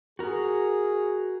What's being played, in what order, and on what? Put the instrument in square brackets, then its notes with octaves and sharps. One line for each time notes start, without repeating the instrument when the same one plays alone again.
[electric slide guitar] F#4 A#4 [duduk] G#4